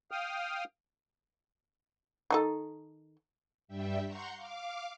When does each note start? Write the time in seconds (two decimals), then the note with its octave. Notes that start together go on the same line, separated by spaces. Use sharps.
0.11 F5 G5 D#6 F6
2.30 D#3 D#4 A4
3.68 G2 G3 G4 E5
4.05 F#5 A#5 C6 C#6 G6
4.35 F5 D6